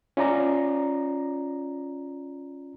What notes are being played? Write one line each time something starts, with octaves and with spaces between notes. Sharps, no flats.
C#4 F4 D5 A#5